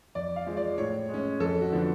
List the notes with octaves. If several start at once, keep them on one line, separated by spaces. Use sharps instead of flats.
F2 D5
F5
F3 G#3
D5
A2 C#5
G#3 C#4
F2 A4
F#4
D3 F3 B3 D4